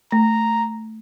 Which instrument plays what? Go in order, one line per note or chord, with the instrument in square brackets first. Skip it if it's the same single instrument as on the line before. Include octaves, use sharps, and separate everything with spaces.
[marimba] A3 [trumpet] A#5